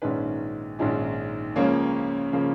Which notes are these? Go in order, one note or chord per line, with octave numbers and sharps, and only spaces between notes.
A#1 G#2 D#3 G#3 C#4 B4
A#1 G#2 D#3 G#3 C#4
C#2 C#3 F3 A#3 C#4 C#5
C#3 F3 A#3